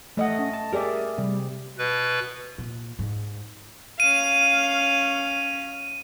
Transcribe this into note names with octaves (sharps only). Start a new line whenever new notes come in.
E2 A3 D#5 F#5
C#4
A5
G4 G#4 A#4 D5 E5
C3 G3
B2 B4
A#2
G#2
C#4 F5 D#7